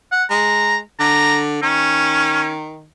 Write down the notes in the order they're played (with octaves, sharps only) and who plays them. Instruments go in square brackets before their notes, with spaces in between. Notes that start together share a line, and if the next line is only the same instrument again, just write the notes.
[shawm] F#5
[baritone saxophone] G#3 [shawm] A#5
[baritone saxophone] D3 [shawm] A#5
[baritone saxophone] D#3 [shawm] C#4